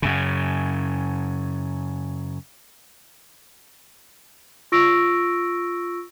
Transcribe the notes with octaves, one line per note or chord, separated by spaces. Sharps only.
F#2 C#3
F4 C#6 E6 A#6 D7